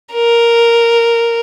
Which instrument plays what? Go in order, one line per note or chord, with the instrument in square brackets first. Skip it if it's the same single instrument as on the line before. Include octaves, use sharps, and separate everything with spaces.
[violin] A#4